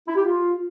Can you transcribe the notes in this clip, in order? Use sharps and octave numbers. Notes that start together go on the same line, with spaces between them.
E4
G4
F4